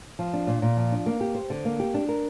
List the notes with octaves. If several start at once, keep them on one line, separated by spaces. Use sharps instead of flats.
F3
D4
A#2
A#2
F3
D4
A#3
G4
C5
D3
A#3
G4
D4
A#4